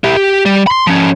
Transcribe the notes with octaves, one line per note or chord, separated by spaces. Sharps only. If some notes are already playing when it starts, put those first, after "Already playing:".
E4 G4
G4
G3
B5 C6
F3 C#4